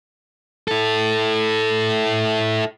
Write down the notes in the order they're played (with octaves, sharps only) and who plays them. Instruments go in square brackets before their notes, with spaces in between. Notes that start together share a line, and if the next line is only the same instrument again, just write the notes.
[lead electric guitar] E4 A4